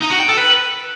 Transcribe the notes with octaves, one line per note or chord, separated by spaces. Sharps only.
D#4
F#4
G5
A4
B4